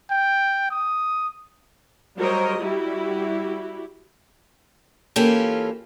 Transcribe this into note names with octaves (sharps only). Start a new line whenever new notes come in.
G5
D#6
F#3 G3 A#4 C5 C#5 D#5
G3 E4 F#4 G4
E3 A#3 C#4 F4 G4 A4